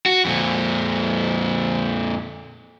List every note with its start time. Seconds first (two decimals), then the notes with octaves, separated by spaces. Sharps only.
0.06 F#4
0.25 F2 A#2